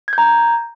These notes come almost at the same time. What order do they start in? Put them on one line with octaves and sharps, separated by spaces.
G#6 G6 A#5